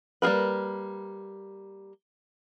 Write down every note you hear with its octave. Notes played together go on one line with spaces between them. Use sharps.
G3 A#3 G#4 A#4 B4